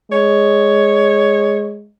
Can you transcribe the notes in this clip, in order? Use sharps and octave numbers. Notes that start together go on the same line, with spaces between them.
G#3 C#5